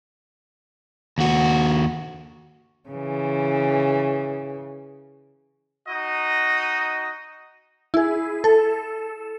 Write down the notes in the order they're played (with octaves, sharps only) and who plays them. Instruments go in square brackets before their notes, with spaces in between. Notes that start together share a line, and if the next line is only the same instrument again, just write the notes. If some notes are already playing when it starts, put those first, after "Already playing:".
[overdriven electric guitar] D#2 F#4
[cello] C#3 E3
[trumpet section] D#4 F#4 D#5
[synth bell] E4 G#4
A4